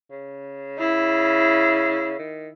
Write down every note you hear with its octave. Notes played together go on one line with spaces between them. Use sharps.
C#3
C#3 E4
D#3